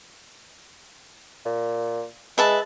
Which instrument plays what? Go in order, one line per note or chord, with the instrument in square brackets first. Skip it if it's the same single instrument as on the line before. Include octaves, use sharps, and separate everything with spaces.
[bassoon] A#2
[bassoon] G#3 [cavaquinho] B4 E5 A5